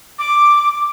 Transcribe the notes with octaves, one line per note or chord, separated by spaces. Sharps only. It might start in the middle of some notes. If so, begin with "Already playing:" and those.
D6